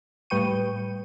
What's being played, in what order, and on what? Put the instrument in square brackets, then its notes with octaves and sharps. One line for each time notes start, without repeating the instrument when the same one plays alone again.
[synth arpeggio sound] A2 G3 B4 G5 C#6 D#7